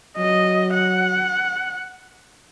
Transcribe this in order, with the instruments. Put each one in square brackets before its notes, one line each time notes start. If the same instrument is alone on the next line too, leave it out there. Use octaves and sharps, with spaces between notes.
[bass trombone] F#3 [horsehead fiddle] D#5
[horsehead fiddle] F#5